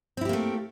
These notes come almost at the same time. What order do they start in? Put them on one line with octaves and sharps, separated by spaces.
C4 E4 G4 A#3 A3